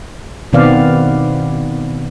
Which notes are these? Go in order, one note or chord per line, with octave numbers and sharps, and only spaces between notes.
B2 D#3 B3 C4 D5 F5